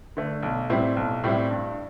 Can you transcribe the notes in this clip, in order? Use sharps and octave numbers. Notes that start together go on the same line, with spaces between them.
D3 A3
B1
A2 G3 C4 E4
B1
A2 G3 C4 E4
G2